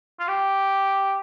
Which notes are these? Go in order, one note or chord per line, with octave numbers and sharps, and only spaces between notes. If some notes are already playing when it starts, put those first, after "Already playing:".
F4
G4